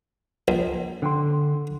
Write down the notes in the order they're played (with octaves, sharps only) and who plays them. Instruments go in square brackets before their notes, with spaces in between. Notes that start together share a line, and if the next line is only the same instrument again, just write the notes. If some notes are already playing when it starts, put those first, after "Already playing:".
[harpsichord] A#1
[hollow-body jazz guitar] D3 G5 C6